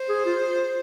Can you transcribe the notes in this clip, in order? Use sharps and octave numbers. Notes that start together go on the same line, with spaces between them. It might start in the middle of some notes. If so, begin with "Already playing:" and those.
Already playing: C5
G#4
F4